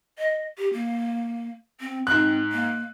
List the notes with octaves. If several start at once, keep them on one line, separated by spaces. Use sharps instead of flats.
D#5
G4
A#3
C4
G#2 C4 F#6
A#3